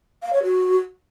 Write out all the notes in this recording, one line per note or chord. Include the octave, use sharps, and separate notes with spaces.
F5
C#5
F#4